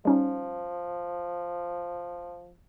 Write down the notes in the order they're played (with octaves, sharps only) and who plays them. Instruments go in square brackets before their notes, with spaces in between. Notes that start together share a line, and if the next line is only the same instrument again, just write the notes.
[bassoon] F3 [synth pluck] G3 C#4 D#4